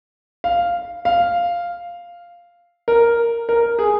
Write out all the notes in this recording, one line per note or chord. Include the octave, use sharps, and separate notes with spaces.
F5
F5
A#4
A#4
G#4